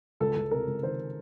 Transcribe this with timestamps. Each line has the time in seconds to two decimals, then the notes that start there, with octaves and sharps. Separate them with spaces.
0.20 C#2 A4
0.36 C#2
0.51 C3 A#4
0.67 C#2
0.83 D#3 C5